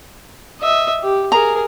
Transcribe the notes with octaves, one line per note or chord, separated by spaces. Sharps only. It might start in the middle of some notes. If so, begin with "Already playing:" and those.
D#5 E5
G4
G#4 A#4 A#5